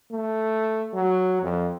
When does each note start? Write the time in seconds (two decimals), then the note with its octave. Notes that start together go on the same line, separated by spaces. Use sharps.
0.11 A3
0.93 F#3
1.42 F2